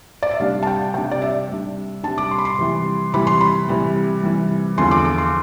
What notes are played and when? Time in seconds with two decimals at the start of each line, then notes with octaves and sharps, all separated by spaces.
0.23 D5
0.31 E5
0.39 C3 G3 D4 F5
0.63 A5
0.67 G5
0.94 C3 G3 D4 G5
1.11 D5
1.22 E5
1.49 C3 G3 D4
2.03 C3 G3 D4 A5
2.18 D6
2.31 C6
2.38 B5
2.45 C6
2.59 C3 E3 G3
3.14 C3 E3 G3 B5
3.27 C6
3.41 B5
3.68 C3 E3 G3
4.23 C3 E3 G3
4.78 E2 D3 F3 C6
4.91 D6
5.05 D6
5.18 C6